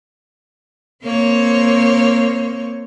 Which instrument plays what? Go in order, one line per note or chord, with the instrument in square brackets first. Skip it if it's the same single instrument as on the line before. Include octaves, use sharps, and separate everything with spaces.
[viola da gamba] A#3 C4 C#5